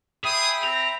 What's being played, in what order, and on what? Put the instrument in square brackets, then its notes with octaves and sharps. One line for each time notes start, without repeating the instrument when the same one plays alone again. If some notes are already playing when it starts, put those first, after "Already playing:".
[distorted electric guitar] G#4 [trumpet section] C#5 D#6 [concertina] E5 G5 B5
[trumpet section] C4 [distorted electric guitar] A#5